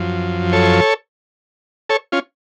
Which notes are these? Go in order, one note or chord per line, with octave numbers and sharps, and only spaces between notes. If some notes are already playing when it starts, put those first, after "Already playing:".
Already playing: F#2 F3
A4 C#5
A4 C#5
C#4 F4